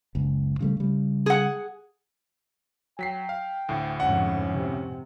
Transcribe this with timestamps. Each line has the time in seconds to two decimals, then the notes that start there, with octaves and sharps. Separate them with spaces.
0.15 F#1 C#2
0.61 C#3 G3 A3
0.77 C#3 G3
1.26 G#4 F#5
2.99 F#3 G5 B6 C7
3.29 F5
3.69 D2 A2
4.00 F2 G#2 C#4 F#5
4.53 C3